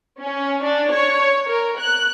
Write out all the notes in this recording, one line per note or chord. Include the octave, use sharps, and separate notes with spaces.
C#4
D4
C#5
A#4
F#6